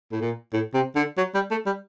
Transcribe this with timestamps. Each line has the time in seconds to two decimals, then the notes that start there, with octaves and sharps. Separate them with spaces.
0.12 A2
0.21 A#2
0.53 A2
0.74 C3
0.96 D3
1.17 F#3
1.35 G3
1.51 A3
1.66 G3